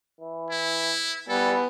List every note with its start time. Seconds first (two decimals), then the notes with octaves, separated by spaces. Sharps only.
0.21 E3
0.51 E4
1.29 G3 B3 A4 G#5